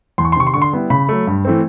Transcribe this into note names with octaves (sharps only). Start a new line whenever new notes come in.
E2 C6
C#6
C6
C3 D#3 C#6
C6
D3 C#6
C6
G3 B3 E4
C#3 B5
F#3 A3
G2
E3 A3 C4